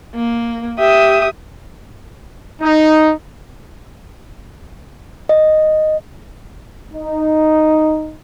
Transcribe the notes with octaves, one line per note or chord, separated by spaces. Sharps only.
A#3
G4 E5 D#6
D#4
D#5
D#4